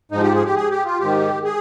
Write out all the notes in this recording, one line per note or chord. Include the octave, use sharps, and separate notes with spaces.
G#2 F3 D#4
G4
G#4
G4
G#4
G4
F4
G#2 D#3 G4
G#4